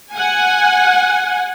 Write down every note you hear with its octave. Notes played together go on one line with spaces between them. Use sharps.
F#5 G#5